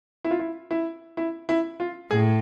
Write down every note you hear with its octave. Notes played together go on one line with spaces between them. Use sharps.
E4
F4
E4
E4
E4
E4
F4
A2 G#4